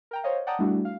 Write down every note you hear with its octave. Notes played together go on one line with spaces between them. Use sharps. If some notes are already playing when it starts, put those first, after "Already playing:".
A#4 G5 A#5
C5 C#5 D#5 F5
D5 F#5 G5 A5 A#5 D#6
G3 A3 D4 E4 F#4
F5